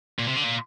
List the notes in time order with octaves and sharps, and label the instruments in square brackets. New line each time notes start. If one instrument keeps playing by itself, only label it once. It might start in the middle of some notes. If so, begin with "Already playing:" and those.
[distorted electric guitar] A#2
C3
D3
A#2